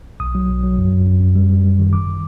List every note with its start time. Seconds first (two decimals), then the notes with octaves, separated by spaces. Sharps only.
0.20 B1 D#6
0.35 F#3
0.50 B1
0.63 F#3
0.78 F#2
0.92 F#2
1.06 F#2
1.20 F#2
1.35 G3
1.49 G3
1.64 G3
1.79 D#3
1.93 G#1 D6
2.07 D#3